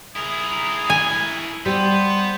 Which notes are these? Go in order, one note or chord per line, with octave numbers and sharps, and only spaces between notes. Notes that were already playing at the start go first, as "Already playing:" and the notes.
E4 G#4 A#4
G#5
G3 B3 C5